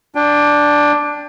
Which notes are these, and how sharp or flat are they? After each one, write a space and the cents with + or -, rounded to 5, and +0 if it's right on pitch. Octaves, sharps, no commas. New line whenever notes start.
D4 +0 G5 +25